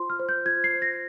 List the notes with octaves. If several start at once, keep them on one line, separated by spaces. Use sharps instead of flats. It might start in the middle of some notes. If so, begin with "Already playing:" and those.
Already playing: F4 C5 C6
F6
C5
G6
F4 G#6
C7
C5
A#6